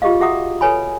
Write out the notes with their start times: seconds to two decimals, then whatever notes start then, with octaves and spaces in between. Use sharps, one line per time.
0.02 F4 G4 G#4 D#5 F5
0.20 F#4 G#4 E5 F#5 A#5 D#6
0.61 A4 B4 C#5 G#5 B5